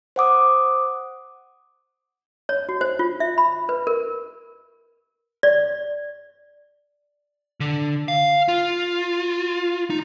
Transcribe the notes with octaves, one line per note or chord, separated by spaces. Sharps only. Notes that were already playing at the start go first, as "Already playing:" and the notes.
C5 F#5 D6 D#6
C#5
F#4
C5
F4
E5
B5
B4
A#4
D5
D3
F5
F4
D#4